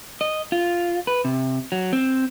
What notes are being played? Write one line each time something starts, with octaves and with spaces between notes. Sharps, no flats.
D#5
F4
B4
C3
F#3
C4